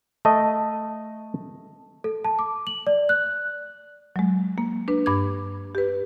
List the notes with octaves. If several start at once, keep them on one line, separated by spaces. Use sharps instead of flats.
A3 D#5 A5
A4
A5
D6
F#7
D5
F#6
F#3 G#3
A#3
D4 B4
G2 D6 G#6
G4 B4